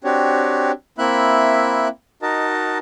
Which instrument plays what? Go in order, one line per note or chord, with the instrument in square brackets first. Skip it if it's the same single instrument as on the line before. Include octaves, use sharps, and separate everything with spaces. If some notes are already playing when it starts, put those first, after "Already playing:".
[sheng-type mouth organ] C4 D4 F#4 G4 C#5
A#3 C4 E4 E5 B5 F#6
D#4 F#4 A#4 D#5 A5